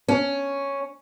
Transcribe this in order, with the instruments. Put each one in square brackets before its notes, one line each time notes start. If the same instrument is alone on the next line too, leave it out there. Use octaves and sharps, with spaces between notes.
[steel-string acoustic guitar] C#4